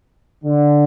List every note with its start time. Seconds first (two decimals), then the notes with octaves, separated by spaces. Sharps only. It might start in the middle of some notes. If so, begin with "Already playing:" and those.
0.44 D3